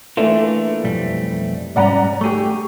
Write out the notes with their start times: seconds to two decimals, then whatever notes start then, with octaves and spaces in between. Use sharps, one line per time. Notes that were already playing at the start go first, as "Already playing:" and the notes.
0.17 E3 A3 A#3 D4 F4
0.84 B1 F2 G3
1.76 G#2 G3 C#4 D5 F#5 A#5
2.21 A3 G4 G#4 C#6